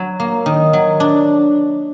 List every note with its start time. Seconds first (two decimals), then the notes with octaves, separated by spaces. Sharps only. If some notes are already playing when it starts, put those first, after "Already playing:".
Already playing: F#3 F#4
0.20 A#3
0.46 D#3
0.73 F#3
1.00 D4